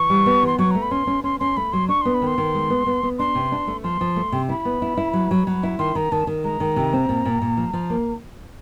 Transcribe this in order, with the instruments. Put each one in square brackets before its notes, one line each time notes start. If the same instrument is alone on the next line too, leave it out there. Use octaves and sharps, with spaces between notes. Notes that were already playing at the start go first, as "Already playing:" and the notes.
Already playing: [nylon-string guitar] E3 [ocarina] C#6
[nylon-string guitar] G3
B3
[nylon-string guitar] E3 [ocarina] C6
[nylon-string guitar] F#3 [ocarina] C#6
[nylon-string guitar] A3 [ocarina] A#5
[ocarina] B5
[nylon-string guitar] C#4 [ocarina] C6
[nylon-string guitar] C#4
[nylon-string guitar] C#4 [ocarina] C6
[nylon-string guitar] C#4 [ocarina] C6
[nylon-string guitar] A3 [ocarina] B5
[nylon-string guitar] F#3 [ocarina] C6
[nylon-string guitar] D4 [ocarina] C#6
[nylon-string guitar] B3 [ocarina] C6
[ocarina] B5
[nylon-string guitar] D#3
[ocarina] C6
[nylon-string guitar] D#3
G#3
B3
B3
B3
[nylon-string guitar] D4 [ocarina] C6
[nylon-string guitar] C3
D4
A3
[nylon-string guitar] F3 [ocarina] C6
[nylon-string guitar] F3
A3
C3
[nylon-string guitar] E4 [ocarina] B5
[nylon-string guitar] B3
E4
E4
F#3
F#3
F#3
E4
[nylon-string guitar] D#3 [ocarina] C6
[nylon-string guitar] D#3 [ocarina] A#5
[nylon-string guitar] D#3 [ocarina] A5
[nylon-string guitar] D#3
[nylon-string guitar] G#3 [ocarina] A#5
[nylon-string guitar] D#3
C3
C4
A#2
A#2
A#2
F3
F3
A#3